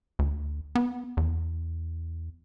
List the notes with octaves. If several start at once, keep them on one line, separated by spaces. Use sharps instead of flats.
D2
B3
E2